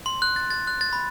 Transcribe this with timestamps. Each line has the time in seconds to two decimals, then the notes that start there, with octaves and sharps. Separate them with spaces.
0.06 C6
0.22 F#6
0.36 A6
0.51 A6
0.67 F#6
0.81 A6
0.93 B5